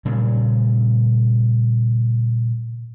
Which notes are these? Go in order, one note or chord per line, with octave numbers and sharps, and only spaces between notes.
A#2 C#3 G3